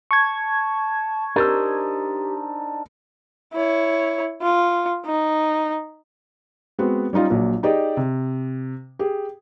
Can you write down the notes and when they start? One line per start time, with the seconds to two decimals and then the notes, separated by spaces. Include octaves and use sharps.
0.11 A5 C#6 G#6
1.36 D4 D#4 G4 A#4 C5 E6
3.53 E4 C#5
4.42 F4
5.06 D#4
6.79 G#3 B3 C4 F#4
7.13 G3 C#4 D#4 F4
7.30 A#1 A#2 F#3
7.63 D#4 G4 G#4 D5 D#5
7.97 C3
8.99 G4 G#4